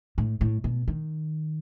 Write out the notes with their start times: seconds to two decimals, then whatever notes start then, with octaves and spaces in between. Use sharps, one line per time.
0.18 A2
0.41 A2
0.64 B2
0.88 D#3